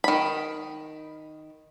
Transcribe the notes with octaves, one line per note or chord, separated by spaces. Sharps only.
D#3 B5